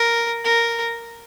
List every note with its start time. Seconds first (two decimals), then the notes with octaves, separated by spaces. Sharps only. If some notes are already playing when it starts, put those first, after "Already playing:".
Already playing: A#4
0.44 A#4